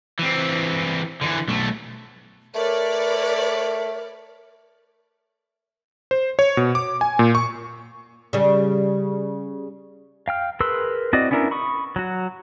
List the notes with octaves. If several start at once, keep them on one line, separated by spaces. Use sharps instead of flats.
E3 C4
D3 E3
B1 A3
A3 A#4 B4 C#5 D5
C5
C#5
B2
D6
G#5
A#2
C#6
C#3 G3
F5 G5 F6
G#4 A#4 B4 C6 E6
C4 E4 F#4 D5 D#5
B3 C#4 D4 E4 A#4
B5 C#6 D#6
F#3 F#4